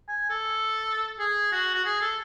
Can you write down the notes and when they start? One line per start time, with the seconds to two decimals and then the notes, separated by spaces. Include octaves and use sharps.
0.08 G#5
0.30 A4
1.19 G#4
1.52 F#4
1.74 F#4
1.85 G#4
2.01 A4